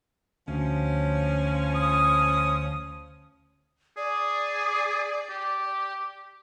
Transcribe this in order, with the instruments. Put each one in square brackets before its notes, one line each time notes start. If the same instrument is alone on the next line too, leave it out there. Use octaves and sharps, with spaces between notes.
[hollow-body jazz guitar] D2 [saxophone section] F3 C#4
[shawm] D#6
[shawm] G#4 [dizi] D5
[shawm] G4